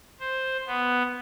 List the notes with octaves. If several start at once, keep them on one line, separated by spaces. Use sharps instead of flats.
C5
B3